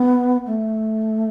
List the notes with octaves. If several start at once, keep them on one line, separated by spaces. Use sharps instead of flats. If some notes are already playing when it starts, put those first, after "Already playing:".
Already playing: B3
A3